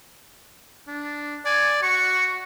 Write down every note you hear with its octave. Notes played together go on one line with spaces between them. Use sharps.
D4
D5 G#5
F#4 C#6